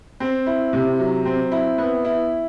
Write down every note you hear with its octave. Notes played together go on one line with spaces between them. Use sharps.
C4
E4
C3
F#3
C4
E4
B3
E4